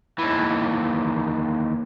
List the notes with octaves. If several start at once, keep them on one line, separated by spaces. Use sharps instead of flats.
D#2 E3